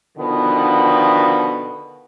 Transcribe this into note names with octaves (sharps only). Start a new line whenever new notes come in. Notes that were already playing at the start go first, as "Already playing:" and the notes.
B2 D3 D#3 F3 B3